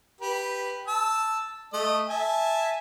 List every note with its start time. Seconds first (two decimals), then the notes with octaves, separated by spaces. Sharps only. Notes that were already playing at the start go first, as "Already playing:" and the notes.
0.21 G4 B4
0.87 A5 E6
1.73 A3 D#5
2.09 E5 G#5 A5